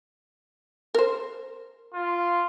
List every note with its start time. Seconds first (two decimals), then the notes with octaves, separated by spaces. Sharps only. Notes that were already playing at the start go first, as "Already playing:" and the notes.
0.95 A#4 C5
1.94 F4